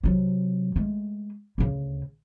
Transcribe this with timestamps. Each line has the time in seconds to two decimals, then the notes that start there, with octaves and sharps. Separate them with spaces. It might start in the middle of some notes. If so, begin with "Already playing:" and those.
0.03 C3 F#3
0.76 G#3 A3
1.58 D2 C#3